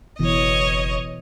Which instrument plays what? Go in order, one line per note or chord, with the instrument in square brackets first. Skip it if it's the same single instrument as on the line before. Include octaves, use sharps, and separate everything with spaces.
[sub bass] F#1 [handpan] B2 E3 [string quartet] C#5 D#5